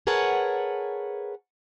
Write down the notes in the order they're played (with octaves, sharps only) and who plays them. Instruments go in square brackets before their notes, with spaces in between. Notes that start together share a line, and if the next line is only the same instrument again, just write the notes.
[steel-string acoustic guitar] G#4 A#4 B4 C#5 F#5 A5